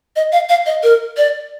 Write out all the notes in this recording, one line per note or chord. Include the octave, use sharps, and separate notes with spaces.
D#5
F5
F5
D#5
A#4
D5